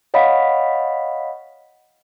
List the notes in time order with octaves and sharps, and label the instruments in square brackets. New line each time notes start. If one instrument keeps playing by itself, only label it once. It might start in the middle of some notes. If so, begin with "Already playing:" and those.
[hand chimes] C#5 D#5 F5 F#5 B5 B6